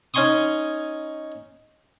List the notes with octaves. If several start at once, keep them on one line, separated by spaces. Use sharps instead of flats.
C#4 D#4 G#5 C6 C#6 D#6